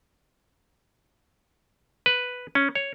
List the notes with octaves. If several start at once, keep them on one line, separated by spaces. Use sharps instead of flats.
B4
C#4
C#5